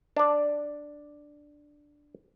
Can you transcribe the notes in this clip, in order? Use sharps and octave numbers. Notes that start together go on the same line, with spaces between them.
D4 D5